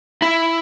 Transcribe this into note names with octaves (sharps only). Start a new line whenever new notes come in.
E4